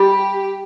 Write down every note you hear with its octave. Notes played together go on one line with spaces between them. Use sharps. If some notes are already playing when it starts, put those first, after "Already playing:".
Already playing: G3 G4